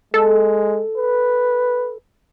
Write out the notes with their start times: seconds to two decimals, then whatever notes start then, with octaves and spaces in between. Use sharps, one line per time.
0.14 G#3 A4
0.98 B4